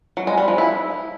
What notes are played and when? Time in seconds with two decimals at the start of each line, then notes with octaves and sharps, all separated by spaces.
0.17 F#3
0.27 G#3
0.38 G3
0.48 F3
0.58 E4